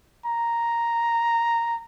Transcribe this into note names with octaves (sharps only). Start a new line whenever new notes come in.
A#5